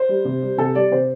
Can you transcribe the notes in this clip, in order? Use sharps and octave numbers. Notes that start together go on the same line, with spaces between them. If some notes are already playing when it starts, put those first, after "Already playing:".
Already playing: C5
G3
C3
G3
C3 A4
G3 D5
C3 C5